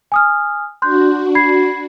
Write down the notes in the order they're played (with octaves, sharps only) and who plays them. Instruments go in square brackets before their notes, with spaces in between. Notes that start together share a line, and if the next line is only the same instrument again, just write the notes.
[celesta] G#5 D#6 F6
[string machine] D4 F#4 [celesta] C6 F#6 G6
[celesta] B5 G#6 C7